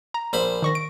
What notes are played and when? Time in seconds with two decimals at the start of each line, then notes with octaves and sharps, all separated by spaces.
0.14 A#5
0.33 A#1 C5 B5
0.62 D#3 C#6 A#6
0.75 D7